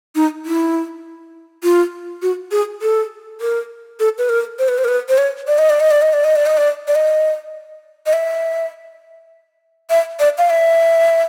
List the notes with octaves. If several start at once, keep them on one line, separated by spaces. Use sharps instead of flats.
D#4
E4
F4
F#4
G#4
A4
A#4
A4
B4
A#4
C5
B4
C5
A#4
B4
C5
C#5
D5
D#5
D5
D#5
D5
D#5
D5
D#5
D5
D#5
D5
D5
D#5
D#5
E5
E5
D5
F5
E5